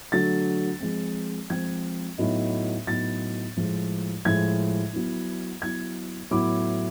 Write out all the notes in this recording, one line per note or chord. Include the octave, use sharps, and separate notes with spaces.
D3 F#3 A3 A6
F3 G#3 C4
F3 G#3 C4 G#6
A2 F#3 B3 D#4
A2 F#3 B3 D#4 A6
A2 F3 G#3
A2 F3 G#3 G#6
F#3 B3 E4
F#3 B3 E4 G#6
A2 F#3 B3 E4 D6